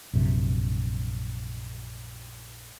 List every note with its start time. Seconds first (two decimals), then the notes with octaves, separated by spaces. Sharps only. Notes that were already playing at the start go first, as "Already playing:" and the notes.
0.13 A#1 F#2 C3